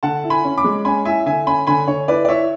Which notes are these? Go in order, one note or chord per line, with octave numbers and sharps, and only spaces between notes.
D3 F#5 A5
E4
G#5 B5
C#4
B5 D6
G#3
C#4 G#5 B5
E4 E5 G#5
D3 E5 G#5
C#4 G#5 B5
D3 G#5 B5
D3 C#5
E4 B4 D5
D5
E4 C#5 E5